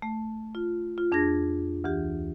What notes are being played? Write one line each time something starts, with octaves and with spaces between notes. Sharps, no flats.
A3
F4
F4
F2 D4 G#4 G#6 A#6
D2 E3 G4